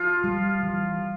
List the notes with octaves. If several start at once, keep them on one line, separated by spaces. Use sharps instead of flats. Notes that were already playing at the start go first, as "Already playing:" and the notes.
Already playing: F3 F4
G3
E3